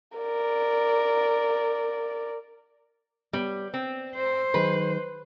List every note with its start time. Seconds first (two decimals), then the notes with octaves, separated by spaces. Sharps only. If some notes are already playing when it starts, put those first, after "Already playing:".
0.18 A#4 D5
3.33 G3 B3 C#5
3.74 C4
4.15 C5
4.54 D#3 F#3 G#4 B4